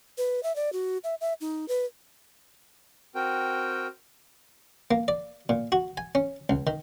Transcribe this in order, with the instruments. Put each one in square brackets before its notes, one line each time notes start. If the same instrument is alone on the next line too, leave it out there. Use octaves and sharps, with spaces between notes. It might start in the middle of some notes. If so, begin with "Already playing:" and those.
[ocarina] B4
E5
D5
F#4
E5
E5
D#4
B4
[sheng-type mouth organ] C4 F#4 A#4 G5
[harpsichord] A#3
D5
A#2
F#4
G#5
C#4
C#2
D#3